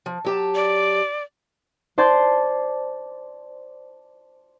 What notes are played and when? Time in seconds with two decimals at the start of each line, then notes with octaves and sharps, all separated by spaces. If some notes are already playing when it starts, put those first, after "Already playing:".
0.06 F3
0.25 F#3 G4 A5
0.55 D5
1.98 C5 D5 A5 G6 G#6